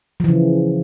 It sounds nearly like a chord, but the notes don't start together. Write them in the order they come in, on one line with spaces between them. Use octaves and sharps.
F3 E3 C#3